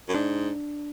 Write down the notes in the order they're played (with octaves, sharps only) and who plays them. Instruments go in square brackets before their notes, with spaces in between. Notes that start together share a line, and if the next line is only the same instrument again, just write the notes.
[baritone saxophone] F#2
[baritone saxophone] G#2 [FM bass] D4